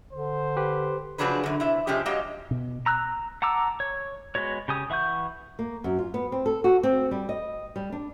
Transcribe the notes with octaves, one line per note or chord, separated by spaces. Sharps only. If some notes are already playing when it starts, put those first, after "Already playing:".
D3 C5
G4 B4
C#3 F3 F#3 D4 G#4 B4
F#2 D3
C3 E4
C3 F3 G#3 C#4 G4
F#3 G#3 G4 C#5 D#5 F5
B2
A#5 E6 F#6
F#5 A5 A#5 D6 E6
C#5
G#3 B3 F#4 C#5
C#3 G4 G#5 D#6
E3 E5 F#5 C#6 G6
A#3
F#2
F4
B3
C4
A4
F#4
C4
G3
D#5
G3
D4